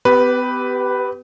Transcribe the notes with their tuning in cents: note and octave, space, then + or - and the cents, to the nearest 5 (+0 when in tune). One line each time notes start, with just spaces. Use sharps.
B3 +40 G4 -10 B4 +0